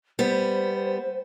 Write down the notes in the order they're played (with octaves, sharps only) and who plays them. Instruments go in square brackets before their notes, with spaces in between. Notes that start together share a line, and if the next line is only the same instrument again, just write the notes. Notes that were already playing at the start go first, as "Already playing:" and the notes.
[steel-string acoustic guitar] G3 B3 [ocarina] C5